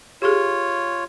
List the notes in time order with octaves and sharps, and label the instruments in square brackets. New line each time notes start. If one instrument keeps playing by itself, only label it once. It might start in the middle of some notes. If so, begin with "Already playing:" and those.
[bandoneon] F4 C#5 [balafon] G4 G#4